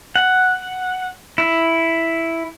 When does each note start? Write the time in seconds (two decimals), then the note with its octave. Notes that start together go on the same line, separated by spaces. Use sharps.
0.16 F#5
1.38 E4